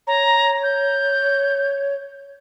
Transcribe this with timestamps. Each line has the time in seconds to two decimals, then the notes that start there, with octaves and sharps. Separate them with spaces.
0.07 C#5 A#5
0.63 G6